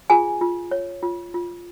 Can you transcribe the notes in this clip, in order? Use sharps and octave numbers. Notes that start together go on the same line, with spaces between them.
F4 G#4 G#5
F4
C#5
F4
F4